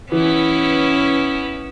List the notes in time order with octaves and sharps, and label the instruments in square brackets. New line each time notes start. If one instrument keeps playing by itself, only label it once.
[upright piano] E3 [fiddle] B3 E4 [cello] C#4